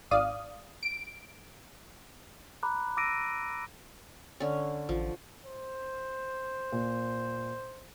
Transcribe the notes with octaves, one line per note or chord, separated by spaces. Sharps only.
G#1 D5 F5 D#6
D7
A#5 B5 D6 F#6
D6 E6 A#6 D7 D#7
D3 C#4
A1 F3
C5
A#2